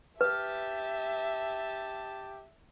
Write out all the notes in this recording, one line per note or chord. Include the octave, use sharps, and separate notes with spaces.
G4 B4 E5 A5